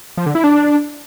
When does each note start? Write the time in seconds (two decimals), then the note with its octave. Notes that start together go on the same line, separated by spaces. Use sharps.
0.18 F3
0.26 D3
0.35 E4
0.44 D4